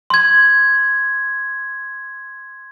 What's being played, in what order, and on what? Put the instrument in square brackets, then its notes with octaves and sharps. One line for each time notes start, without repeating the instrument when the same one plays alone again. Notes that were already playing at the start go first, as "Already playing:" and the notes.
[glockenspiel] C6 G#6